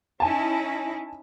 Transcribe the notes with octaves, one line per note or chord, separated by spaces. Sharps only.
C#4 D#4 E4 G#5 A5